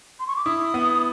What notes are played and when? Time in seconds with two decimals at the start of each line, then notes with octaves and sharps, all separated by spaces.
0.20 C6
0.27 C#6
0.36 D6
0.45 E4 D#6
0.74 B3